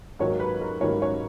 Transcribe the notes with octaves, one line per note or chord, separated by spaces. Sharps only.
G#2 D#3 F#3 A#3 C#5
B4
A#4
G#2 D#3 F#3 A#3 C#5
C#5